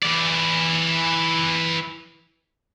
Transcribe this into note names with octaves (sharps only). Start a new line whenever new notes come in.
E3 D5